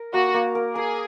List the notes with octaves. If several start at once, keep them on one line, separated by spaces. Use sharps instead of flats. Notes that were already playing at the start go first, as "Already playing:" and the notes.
Already playing: A#4
A#3 F#4
A#3
A#4
G#4 A#4